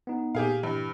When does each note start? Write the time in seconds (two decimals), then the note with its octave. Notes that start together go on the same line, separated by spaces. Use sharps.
0.07 B3 D#4
0.35 A#2 G4 G#4 F5
0.63 G2 E3